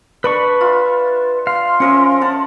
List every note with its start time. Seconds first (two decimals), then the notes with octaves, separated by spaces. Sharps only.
0.24 D4 B4 B5 C#6
0.61 F4 E5
1.47 F5 C6
1.80 F3 C#4 A#4 E5
2.21 F5 F#5 A5